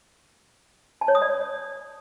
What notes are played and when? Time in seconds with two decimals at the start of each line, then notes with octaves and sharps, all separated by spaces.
1.01 A5
1.08 C#5
1.15 D#6
1.22 D5